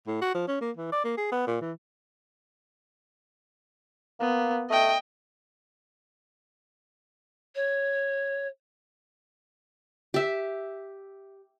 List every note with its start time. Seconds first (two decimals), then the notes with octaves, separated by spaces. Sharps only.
0.07 A2
0.21 F#4
0.34 F3
0.48 C#4
0.61 A#3
0.77 E3
0.92 D5
1.04 A#3
1.18 G#4
1.32 B3
1.47 A#2
1.61 E3
4.20 A#3 B3
4.70 A3 D#5 G5
7.55 C#5
10.14 G4 E5